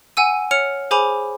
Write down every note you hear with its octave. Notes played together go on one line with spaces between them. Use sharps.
F#5 G#5 E6 D#7
C#5 F6 C#7 F7
G#4 C5 G#5 B5 D6 F7